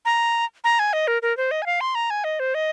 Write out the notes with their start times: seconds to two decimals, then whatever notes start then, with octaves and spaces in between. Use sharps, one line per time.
0.05 A#5
0.64 A#5
0.79 G#5
0.93 D#5
1.08 A#4
1.22 A#4
1.37 C5
1.51 D#5
1.62 G#5
1.66 F5
1.81 C6
1.95 A#5
2.10 G#5
2.24 D#5
2.40 C5
2.54 D#5